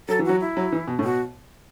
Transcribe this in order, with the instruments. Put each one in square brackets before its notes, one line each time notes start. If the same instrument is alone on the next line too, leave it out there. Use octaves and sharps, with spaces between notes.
[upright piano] F#3 [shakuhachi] A4
[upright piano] E3
[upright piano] F#3 [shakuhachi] F#4
[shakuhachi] E4
[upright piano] F#3
E3
B2
A2
[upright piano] B2 [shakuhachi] F#4